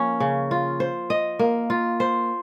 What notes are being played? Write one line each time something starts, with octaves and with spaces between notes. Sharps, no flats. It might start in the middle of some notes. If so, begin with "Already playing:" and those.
Already playing: F3 A#3 C#4
C#3
F4
C5
D#5
A#3
F4
C5